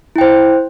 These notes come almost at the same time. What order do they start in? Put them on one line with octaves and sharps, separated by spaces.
E4 G5 C5